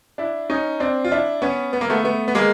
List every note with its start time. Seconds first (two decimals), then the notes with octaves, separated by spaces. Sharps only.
0.18 D4 E4
0.50 C#4 D#4
0.80 C4 D4
1.05 F4
1.12 D4 E4
1.42 B3 C#4
1.73 B3
1.81 A#3
1.90 A3 B3
2.04 A3 B3
2.28 B3
2.35 G#3 A#3